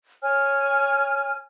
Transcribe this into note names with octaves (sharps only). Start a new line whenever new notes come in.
C#5 G#5 F6